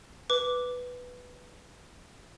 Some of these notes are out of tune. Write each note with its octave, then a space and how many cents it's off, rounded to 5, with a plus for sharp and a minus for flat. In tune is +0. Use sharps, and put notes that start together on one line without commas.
B4 +0 D6 -5